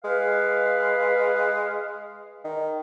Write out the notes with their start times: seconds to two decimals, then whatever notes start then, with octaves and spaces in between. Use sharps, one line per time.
0.04 G#3 B4 F5
2.44 D#3